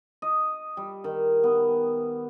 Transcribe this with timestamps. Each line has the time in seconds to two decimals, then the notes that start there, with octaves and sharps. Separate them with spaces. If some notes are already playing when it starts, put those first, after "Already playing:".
0.22 D#5
0.77 G3
1.04 D#3
1.44 B3